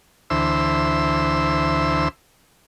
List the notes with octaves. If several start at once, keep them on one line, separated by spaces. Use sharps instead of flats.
D2 E3 C5 E6